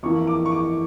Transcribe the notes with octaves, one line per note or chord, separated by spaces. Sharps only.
F2 E3 A#3 C#6
D6
C#6
D6